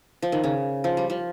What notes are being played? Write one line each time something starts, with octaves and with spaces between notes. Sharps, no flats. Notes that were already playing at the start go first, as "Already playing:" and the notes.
F3
D#3
C#3
F3
G3
F3